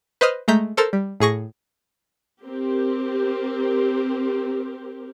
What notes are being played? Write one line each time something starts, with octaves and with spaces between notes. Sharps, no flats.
B4 C5 D#5 D#6 F6
G#3 A3 A#5 G6 B6
A4 A#4 C5 E6 F6 A6
G3
A2 G#4 C#6 A#6
C4 G4 A#4